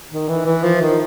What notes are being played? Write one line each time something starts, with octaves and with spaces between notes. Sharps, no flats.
D#3
E3
E3
F3
D#3